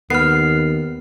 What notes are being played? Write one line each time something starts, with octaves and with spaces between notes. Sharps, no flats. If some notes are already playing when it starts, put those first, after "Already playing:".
D#2 B3 F6 C7